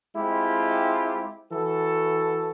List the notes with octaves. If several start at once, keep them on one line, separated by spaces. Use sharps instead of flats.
G#3 C4 E4 F4 G4
E3 F#4 A4